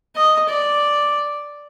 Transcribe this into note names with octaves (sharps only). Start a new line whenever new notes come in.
D#5
D5